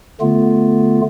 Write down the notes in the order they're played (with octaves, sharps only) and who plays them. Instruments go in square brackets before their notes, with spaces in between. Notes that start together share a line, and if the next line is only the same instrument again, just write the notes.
[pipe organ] D3 A3 B3 F4